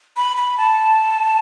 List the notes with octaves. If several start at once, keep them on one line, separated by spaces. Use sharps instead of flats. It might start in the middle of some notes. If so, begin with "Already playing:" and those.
B5
B5
A5